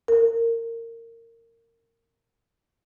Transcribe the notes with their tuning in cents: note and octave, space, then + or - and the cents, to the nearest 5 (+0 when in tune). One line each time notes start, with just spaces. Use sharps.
A#4 -20